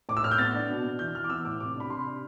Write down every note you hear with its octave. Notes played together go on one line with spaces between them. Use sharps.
A2 D6
E6
A2 F6
G6
B3 A6
D4
B2
B2
E3 G6
E3 F6
D6
B3 E6
A2 D6
C3 D6
D4 B5
C3 C6
D4